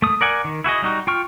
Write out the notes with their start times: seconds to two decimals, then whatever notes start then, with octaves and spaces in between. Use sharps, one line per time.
0.02 A3 D#6
0.21 A#4 D5 F#5 G#5
0.44 D#3
0.64 E4 F#4 G#4 D#5
0.82 G3 D#4 F#4
1.07 F4 G5 C#6 F6